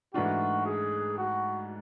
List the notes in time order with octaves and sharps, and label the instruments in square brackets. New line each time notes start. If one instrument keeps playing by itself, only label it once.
[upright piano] G#2 E3 A3 D4 F4 [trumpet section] F#4
[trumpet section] G#4
F#4